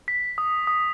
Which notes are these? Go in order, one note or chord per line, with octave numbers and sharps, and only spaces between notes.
B6
D#6
D#6